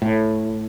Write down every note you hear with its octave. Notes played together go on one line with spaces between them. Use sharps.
A2